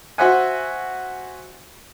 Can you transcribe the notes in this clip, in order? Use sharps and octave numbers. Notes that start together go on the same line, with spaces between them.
F#4 C5 E5 F#5 G#5